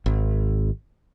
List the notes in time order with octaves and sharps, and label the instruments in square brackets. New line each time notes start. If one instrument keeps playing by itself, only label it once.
[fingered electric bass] G#1